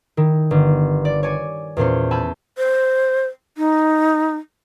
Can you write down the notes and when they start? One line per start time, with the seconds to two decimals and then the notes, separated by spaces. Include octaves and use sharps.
0.17 D#3 E4
0.51 G1
1.05 D5
1.23 C#5 D5 G#5
1.77 E2 A#2 C#4 C5
2.11 G#5 A5 B5 E6 G6
2.58 C5
3.58 D#4